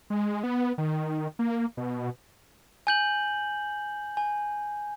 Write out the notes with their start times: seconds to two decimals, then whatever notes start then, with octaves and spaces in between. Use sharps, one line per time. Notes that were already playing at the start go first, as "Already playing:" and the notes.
0.10 G#3
0.43 B3
0.78 D#3
1.39 A#3
1.77 B2
2.87 G#5 G6 F#7
4.17 G#5